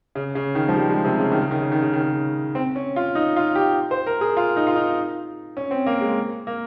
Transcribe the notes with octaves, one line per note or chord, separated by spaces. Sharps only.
C#3
C#3
D#3
F3
G3
G#3
C3
C#3
D#3
C#3
D#3
C#3
D#3
C#3
D#3
C#3
C4
C#4
F4
D#4
F4
G4
C5
A#4
G#4
F4
D#4
F4
D#4
C#4
C4
A#3
G#3
A#3